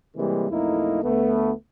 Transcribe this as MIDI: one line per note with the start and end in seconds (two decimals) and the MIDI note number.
0.17 0.48 48
0.17 0.48 52
0.17 0.48 55
0.17 0.48 56
0.17 0.48 58
0.50 1.02 35
0.50 1.02 41
0.50 1.02 57
0.50 1.02 58
0.50 1.02 63
0.50 1.02 64
1.04 1.51 38
1.04 1.51 57
1.04 1.51 59